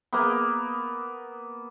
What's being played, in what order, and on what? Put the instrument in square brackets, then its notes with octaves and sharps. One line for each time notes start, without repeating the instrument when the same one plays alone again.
[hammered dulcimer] A#3 B3